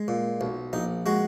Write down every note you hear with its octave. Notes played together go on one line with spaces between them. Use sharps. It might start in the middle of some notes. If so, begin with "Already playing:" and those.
Already playing: G#3
A#2
B1
A#1 D#4
G#3 F#4